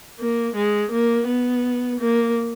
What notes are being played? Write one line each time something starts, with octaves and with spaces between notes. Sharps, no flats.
A#3
G#3
A#3
B3
A#3